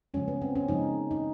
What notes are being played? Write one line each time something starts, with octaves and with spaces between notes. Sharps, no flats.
C#3 F3 G#3 C#4
B3
C4
C#4
C#3 F3 G#3 D#4
D#4